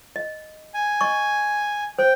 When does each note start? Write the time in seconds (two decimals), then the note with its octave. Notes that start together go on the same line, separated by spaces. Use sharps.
0.16 D#5
0.74 G#5
1.01 D#5 C#6
1.99 C5 G5